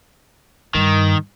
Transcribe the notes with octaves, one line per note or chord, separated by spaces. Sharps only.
G2 D#3